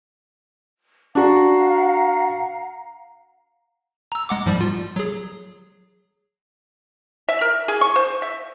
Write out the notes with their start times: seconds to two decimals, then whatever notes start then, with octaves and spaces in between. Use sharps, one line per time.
1.15 D4 F#4 F5 F#5 A#5
4.12 A#5 E6
4.29 G#3 F#5 D6
4.46 G#2 F3 G3
4.61 F4
4.96 F#3 G#4
7.29 E5
7.41 A#4
7.68 G#4
7.81 C#6
7.96 C5
8.22 E5